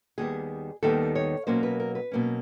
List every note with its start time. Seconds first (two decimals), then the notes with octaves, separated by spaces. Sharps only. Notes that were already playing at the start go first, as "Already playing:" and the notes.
0.18 D#2 D#3 G3 B3 G#4
0.83 D#2 D#3 G3 B3 A4
1.15 C#5
1.47 B2 F#3 A#3 C#4 C5
1.63 B4
1.80 A#4
1.95 B4
2.12 B2 F#3 A#3 C#4